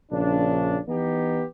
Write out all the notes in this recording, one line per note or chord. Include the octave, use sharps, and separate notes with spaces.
A#1 C#3 D4
E3 B3 D#4 G4